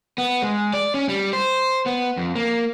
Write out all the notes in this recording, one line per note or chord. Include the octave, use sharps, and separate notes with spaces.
B3
G#3
D5
C#4
G3
C5
B3
F2
A#3